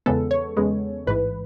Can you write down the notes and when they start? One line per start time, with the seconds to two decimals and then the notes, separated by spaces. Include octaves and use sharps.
0.06 E2 C#3 G#3 B3 A4
0.31 C#5
0.57 E2 C#3 G#3 B3
1.07 A1 G#2 E3 B4